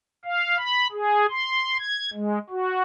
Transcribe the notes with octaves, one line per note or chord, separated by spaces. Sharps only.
F5
B5
G#4
C6
G#6
G#3
F#4